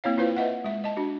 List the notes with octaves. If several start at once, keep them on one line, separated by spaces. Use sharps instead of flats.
A#3 C4 E4 C#5 F5
E4 F4 B4 C5 F5
B4 D#5 E5 F#5
G#3 E5
D#5 A5
D4 F#4